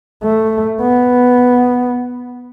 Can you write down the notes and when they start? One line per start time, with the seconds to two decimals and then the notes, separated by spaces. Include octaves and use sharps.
0.24 A3
0.81 B3